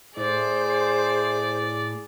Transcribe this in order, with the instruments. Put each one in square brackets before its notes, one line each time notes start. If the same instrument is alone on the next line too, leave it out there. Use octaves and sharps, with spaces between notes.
[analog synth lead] A2 [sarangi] G#4 [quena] C5 [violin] D5